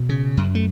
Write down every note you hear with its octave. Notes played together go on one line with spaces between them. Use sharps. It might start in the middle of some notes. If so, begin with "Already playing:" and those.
Already playing: B2
C#3
F#2
A3